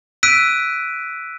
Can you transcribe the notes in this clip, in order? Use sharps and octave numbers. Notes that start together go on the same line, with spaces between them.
E6 F#6 B6 D7 D#7